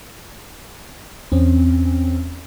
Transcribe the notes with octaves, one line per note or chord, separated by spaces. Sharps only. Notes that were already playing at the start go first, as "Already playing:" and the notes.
E2 C4 C#4